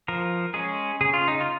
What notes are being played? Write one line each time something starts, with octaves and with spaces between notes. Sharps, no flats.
F3 A#4
G#3 C#4 G#4
C#3 G#4
F4
D#4
F4